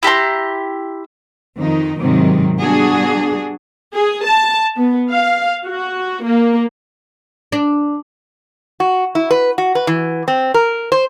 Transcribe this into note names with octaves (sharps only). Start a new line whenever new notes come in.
E4 G4 A#5 C6
F2 D#3 D#4
G#2 C3 D#3 F#3
G3 B3 D4 F#4 G#4
G#4
A5
B3
F5
F#4
A#3
D4
F#4
E4
B4
F#4
B4
E3
C4
A#4
C5